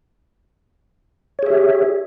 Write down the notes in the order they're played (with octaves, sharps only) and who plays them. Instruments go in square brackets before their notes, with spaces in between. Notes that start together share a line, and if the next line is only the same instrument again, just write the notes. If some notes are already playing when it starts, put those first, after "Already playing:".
[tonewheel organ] C#5
G#4
E5
G4